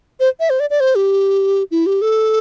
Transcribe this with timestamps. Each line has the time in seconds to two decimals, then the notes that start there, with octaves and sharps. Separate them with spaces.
0.20 C5
0.40 E5
0.50 C5
0.60 D5
0.70 D5
0.80 C5
0.95 G4
1.71 E4
1.86 G4
2.02 A4